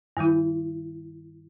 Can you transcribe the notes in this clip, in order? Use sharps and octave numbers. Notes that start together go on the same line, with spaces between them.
G2 D#3 G3 E4